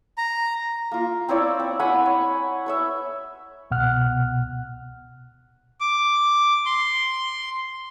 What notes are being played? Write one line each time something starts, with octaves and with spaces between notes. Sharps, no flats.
A#5
A#3 F4
C4 E4 C#5 D5
C4
F#5 G#5 B5 C#6
C#5
B4 C#5 E5
C2 B2 F#5 F6 F#6
D6
C6